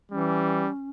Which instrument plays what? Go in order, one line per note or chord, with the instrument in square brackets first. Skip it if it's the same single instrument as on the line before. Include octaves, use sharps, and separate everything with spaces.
[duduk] E3 [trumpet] G3 [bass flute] C#4